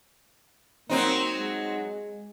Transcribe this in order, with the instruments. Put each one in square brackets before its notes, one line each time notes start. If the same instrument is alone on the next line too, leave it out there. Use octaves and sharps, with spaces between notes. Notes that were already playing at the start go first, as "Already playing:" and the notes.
[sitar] F#3 C4 D#4 [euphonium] A#3
[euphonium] G#3